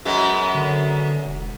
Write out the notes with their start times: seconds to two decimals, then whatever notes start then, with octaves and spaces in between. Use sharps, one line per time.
0.05 F#2 G#3 B3
0.55 D3
1.25 E1